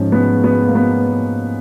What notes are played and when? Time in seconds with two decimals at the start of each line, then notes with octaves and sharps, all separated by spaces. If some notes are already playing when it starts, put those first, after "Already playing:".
Already playing: G#2 F3 C#4 G#4
0.12 B3
0.44 B3
0.68 A#3
0.75 B3